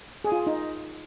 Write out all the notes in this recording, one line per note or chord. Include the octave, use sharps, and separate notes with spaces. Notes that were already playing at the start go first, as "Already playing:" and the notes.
G#4
F4
G#4
D#4